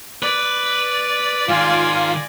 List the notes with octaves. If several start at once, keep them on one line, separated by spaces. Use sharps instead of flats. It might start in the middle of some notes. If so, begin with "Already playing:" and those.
B4 D5
G#2 D#3 F4 F5 G#5